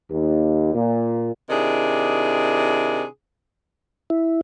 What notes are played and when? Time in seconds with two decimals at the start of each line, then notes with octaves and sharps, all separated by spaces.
0.11 D#2
0.74 A#2
1.50 C3 D#3 D4 E4 G#4
4.10 E4